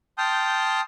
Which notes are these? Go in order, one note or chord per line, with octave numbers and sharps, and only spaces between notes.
G5 A5 C6 D#6 F6 G6